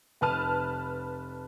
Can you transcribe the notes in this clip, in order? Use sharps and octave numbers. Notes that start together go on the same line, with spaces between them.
F1 B4 A5 F6 D#7